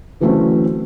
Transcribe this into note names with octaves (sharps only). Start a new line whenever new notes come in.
D3 E3 F#3 A3 C4 C#4